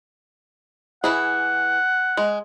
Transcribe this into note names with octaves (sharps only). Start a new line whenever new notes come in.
E3 E4 G#4 F#5
G#3